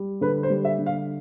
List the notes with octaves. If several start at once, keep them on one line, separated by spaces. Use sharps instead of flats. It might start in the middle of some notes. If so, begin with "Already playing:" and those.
Already playing: G3
D3 B4
C5
G3
E5
D3
F5